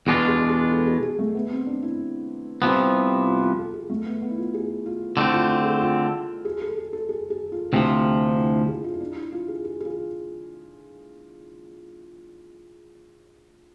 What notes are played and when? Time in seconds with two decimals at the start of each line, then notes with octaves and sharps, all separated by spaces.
0.07 E2 B2 G#3 D4 F4 G#4
0.28 G#4
0.50 G#4
0.71 A4
0.87 G#4
1.03 G#4
1.19 A3
1.35 B3
1.51 C4
1.66 D4
1.83 E4
2.62 C2 C3 F3 B3
3.27 F4
3.42 F4
3.58 A4
3.74 G#4
3.90 A3
4.06 B3
4.22 B3
4.31 E4
4.38 F4
4.54 G#4
4.86 F4
5.17 D3 A3 C4 E4
5.33 F4
5.49 F4
5.61 A4
5.65 G#4
5.81 F4
6.45 G#4
6.62 A4
6.77 G#4
6.93 A4
7.09 G#4
7.30 G#4
7.52 F4
7.73 D2 C3 F3 E4
8.28 D4
8.36 E4
8.53 F4
8.68 G#4
8.84 F4
8.94 E4
9.00 D4
9.16 E4
9.32 F4
9.48 G#4
9.64 G#4
9.81 G#4
9.85 F4